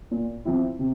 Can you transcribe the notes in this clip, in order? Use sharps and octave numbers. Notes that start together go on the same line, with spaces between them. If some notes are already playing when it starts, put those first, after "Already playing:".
A#2
F3 C4 E4
C3